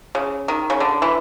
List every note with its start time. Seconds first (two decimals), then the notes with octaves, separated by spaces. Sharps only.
0.15 C#3
0.48 D#3
0.70 C#3
0.80 D3
1.02 E3